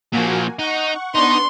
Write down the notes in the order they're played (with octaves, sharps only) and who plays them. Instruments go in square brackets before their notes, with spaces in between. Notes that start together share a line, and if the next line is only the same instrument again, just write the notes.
[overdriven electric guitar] A#2 F3 [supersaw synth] A#3 F#4 G#5
[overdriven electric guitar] D#4 [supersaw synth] F#5 C#6
[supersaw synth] B3 D4 C#6 [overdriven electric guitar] D#4 [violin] C6